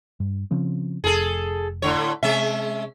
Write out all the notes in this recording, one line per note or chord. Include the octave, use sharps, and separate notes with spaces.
G2
C#3 F3 C4
F1 G#4 A4
A2 D3 C#5
C3 G#3 C#4 E5